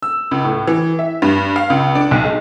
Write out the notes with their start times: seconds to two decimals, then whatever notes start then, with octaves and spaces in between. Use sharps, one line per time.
0.02 E6
0.31 C#2
0.44 A2
0.67 E3
0.99 E5
1.22 G2
1.56 F5
1.70 C#2
1.95 D4
2.11 B1
2.25 G#3